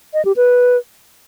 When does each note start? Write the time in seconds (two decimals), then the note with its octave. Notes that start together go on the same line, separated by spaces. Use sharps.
0.14 D#5
0.25 G4
0.36 B4